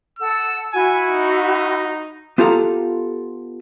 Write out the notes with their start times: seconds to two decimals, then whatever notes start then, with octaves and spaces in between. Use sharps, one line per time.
0.19 A4 F#5 E6
0.73 E4 F#4 G#5
1.08 D#4
2.38 B3 F4 G4 A4 F5 A#5